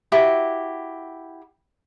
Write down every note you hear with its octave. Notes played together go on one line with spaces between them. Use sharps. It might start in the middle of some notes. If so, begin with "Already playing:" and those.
E4 F#4 G4